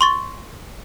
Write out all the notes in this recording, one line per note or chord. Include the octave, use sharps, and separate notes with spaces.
C6 C#6 A6